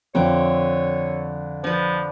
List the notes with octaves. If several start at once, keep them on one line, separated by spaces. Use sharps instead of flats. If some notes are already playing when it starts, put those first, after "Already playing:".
F2 D3 C4 C#5 D6
F3 D4 B4